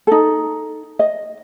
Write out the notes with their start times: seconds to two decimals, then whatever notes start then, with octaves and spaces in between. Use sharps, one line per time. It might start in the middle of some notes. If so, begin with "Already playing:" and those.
0.07 D#4 A4
0.99 D#5